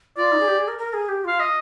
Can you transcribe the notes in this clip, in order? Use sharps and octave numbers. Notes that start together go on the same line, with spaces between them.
F4 D5
D#4
G#4
G4
G#4
A#4
A#4
G#4
G4
F4 F5
D#5